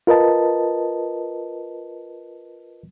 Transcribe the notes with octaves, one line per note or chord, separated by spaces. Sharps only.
F4 A#4 B4 D#5 A5